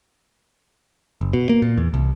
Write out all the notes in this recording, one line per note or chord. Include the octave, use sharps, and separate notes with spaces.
F#1
B2
A#3
A#2
E2
C2